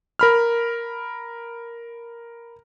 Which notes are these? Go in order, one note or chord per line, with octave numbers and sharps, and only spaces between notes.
A#4 B5 F6